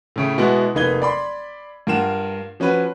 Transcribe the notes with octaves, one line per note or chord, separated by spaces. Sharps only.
A2 C#3 A3
B2 G#3 B3 E4 F#4
F1 A#3 D#4 B4 G#6 G7
D5 B5 C6
G2 F4 A#4 F#5 E7
F3 C#4 F#4 B4